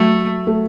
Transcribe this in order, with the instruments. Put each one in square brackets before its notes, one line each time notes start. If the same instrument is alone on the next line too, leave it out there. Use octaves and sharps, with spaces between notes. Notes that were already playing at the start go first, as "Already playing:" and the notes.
Already playing: [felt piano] F#3 [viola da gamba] A3
[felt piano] A3